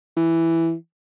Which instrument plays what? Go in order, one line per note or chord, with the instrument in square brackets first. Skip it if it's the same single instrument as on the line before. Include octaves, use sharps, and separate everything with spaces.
[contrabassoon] E3